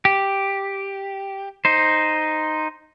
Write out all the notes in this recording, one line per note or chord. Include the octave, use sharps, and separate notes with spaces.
G4
D#4 C5